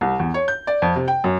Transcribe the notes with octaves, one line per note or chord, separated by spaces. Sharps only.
C2
E2
C#5
G6
D5
F2
C3
G5
F#2